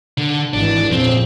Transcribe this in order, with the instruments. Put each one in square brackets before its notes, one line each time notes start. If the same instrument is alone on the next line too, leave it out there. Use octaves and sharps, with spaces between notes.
[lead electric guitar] D3
[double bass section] G#1 E3 [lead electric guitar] D4
[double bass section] F2 A#2 C#3 [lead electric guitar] C4